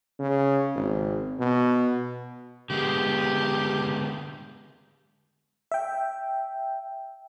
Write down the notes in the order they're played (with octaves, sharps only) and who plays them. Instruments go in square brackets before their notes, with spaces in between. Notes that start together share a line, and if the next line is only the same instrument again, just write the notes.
[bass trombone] C#3
G#1
B2
[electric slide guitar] D3 G#3 B3 [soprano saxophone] G4
[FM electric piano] E5 G5